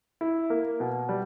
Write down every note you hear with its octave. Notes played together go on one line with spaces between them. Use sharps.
E4
A#3
B2
G3